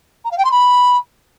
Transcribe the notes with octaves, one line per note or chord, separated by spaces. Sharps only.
A#5
F5
G5
C6
B5